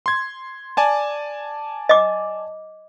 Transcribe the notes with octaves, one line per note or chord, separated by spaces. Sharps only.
C6 G#6
D5 G#5 A5
D#5 D6